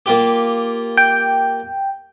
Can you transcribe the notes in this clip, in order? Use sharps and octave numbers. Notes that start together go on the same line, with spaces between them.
A#3 F4 G4
G5